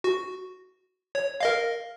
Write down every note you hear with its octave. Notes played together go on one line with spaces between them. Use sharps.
F#4
C#5
A#4 D#5 F5